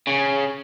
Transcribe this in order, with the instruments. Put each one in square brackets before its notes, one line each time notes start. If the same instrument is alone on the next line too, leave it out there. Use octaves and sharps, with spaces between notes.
[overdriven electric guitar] C#3